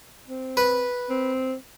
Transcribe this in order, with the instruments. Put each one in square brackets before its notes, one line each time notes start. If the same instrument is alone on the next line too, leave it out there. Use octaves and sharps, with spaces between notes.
[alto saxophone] C4
[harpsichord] B4
[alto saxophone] C4